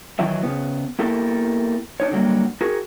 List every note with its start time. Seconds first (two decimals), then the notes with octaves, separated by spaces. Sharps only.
0.19 D#3 E3 F#3 E5
0.43 C#3 B3
0.99 A#3 B3 E4 G4 A4 A#4
2.00 D4 D#4 C#5
2.11 D3 F#3 G3 A#3
2.61 F#4 G#4 A#4